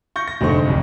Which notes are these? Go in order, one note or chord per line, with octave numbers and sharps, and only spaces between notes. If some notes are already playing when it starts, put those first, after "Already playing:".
C#6 G6 A#6
A#6
F1 G#2 D3 A3 C5 C#6
D#1 C2 F2